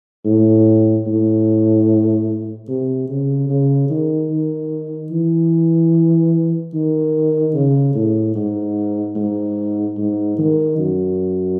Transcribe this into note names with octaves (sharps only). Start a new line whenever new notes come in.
A2
A2
C3
C#3
C#3
D#3
D#3
E3
D#3
C#3
A2
G#2
G#2
G#2
D#3
F#2